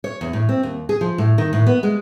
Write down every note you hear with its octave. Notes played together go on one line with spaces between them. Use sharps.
C#5
E2
A2
C4
D#2
G#4
F3
A2
D#3
A2
B3
G#3